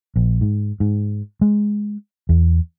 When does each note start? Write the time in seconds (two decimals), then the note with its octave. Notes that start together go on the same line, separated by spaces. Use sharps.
0.16 A#1
0.41 G#2
0.80 G#2
1.41 G#3
2.29 E2